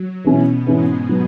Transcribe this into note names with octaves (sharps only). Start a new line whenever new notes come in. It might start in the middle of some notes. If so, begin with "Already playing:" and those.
Already playing: F#3
B2 E3 B3 C#4 E4
G#2 E3 G#3 C#4 E4
F#3 B3